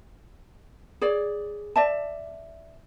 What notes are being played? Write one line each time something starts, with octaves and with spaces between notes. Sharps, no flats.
G#4 C#5 D5
D5 E5 A5